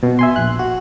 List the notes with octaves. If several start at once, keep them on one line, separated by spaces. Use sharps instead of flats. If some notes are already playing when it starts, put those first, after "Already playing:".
B2
E5 G#5 C6
A#1 F#6
F#4